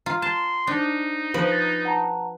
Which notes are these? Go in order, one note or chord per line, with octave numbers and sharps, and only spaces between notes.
F4 A#5
A5 C6
D4 D#4 C5
F3 B4
A6 B6
F#5 A5 A#5